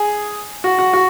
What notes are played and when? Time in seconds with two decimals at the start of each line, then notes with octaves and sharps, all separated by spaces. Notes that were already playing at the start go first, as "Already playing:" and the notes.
Already playing: G#4
0.64 F#4
0.79 F#4
0.94 F#4